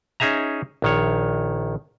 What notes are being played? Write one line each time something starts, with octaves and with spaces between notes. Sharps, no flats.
C#4 D#4 G#4 E5 A#5
A#1 D#3 C#5